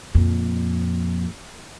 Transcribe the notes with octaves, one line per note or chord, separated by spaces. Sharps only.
F2 A#2